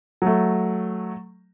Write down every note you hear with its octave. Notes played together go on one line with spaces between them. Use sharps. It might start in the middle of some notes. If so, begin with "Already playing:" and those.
F#3 A3